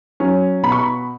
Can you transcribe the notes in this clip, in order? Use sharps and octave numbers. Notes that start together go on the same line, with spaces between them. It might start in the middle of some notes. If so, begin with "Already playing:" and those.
F#3 C#4
B2 B5
C#6
B5